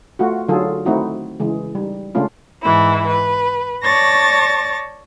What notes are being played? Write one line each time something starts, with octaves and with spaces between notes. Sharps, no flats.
A3 F4 F#4
D3 F#3 D#4 F4 G#4 A4
D#3 A3 C4 D#4 E4 F#4
C#3 E3 G#3
G3 D#4
C#3 G#3 A3 C#4 D4 F4
G#2 E3 E4
B4
C#5 D5 A5 C#6 A6 A#6